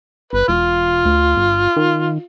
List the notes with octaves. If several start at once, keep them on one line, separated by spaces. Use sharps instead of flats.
G1 B4
E1 F4
D2
G1
D#3